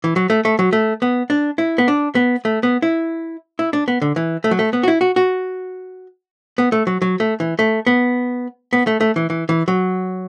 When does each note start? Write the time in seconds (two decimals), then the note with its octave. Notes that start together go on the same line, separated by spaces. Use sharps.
0.04 E3
0.16 F#3
0.30 A3
0.45 A3
0.59 F#3
0.73 A3
1.02 B3
1.30 D4
1.58 E4
1.78 B3
1.88 D4
2.15 B3
2.45 A3
2.63 B3
2.82 E4
3.59 E4
3.73 D4
3.88 B3
4.02 D3
4.16 E3
4.44 A3
4.51 F#3
4.59 A3
4.73 B3
4.83 F#4
4.88 E4
5.01 F#4
5.16 F#4
6.58 B3
6.72 A3
6.87 F#3
7.02 F#3
7.20 A3
7.40 E3
7.59 A3
7.87 B3
8.73 B3
8.87 A3
9.01 A3
9.16 E3
9.30 E3
9.49 E3
9.68 F#3